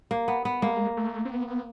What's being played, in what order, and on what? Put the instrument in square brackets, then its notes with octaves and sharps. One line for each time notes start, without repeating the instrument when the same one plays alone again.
[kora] A#3
B3
B3
[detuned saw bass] G#3 [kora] A#3
[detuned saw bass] A3
C4
B3
B3